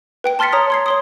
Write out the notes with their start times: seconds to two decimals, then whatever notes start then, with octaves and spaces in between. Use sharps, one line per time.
0.24 B4 G5 D7
0.39 A5 C6 F6 A6 B6 C#7
0.52 C#5 A#5 D#6 F6
0.70 C6 G#6 C7
0.86 C#5 C6 D#6